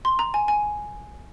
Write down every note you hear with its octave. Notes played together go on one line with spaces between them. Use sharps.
C6
A#5
G#5
G#5